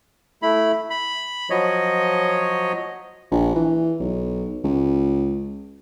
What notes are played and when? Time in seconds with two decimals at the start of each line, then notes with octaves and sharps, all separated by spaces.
0.42 A3 E4 B5
0.90 B5
1.50 F3 F#3 C#5 D#5
3.31 A#1
3.55 E3
4.00 B1
4.64 C#2